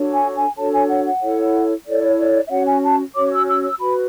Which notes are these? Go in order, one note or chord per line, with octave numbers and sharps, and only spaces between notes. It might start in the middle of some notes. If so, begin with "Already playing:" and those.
Already playing: D4 F#4 A4 C#5
G#5
G#5
D4 F#4 A4 C#5 A5
G#5
F#5
F#5
E4 A4 C#5
E4 A4 C#5 D5
D5
E5
C#4 F#4 C#5 F#5
G#5
A5
C#4 F#4 C#5 D6
E6
E6
E6
F#4 B4 B5